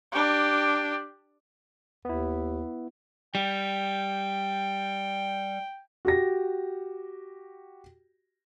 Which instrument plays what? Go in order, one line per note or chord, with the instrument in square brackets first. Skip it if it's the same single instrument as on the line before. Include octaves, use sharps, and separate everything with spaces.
[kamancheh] D4 G4
[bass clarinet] D#2 [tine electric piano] B3 E4
[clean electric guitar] G3 [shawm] G5
[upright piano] F#4 G4 A#6